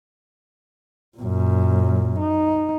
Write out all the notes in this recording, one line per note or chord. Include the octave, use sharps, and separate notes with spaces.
F#2 A#2
D#4